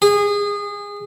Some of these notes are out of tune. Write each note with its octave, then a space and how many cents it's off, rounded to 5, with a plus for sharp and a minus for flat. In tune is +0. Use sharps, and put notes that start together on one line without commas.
G#4 -25